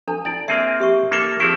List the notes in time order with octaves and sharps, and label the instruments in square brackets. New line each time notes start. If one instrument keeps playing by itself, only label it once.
[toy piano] D4 A4 A5
[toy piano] D4 E4 [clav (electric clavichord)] D5
[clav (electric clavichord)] A#3 C4 G#4 [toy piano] E5
[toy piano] G4 E5 C#6
[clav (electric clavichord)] A#3 A4 [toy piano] D#4 C6 D6
[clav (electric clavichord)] F3 C4 E4 [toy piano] G#4 C#6